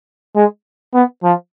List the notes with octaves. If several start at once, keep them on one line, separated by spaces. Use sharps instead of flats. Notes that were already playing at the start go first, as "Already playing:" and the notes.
G#3
B3
F3